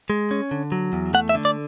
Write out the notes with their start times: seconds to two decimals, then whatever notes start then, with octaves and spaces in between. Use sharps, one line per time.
0.10 G#3
0.31 C#4
0.51 D3
0.72 F#3
0.93 E2
1.14 A3 F#5
1.29 E5
1.35 D3
1.45 D5